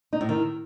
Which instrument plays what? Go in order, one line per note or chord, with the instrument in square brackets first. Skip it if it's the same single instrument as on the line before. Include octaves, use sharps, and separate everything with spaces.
[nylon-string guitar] D#4
A2
D#3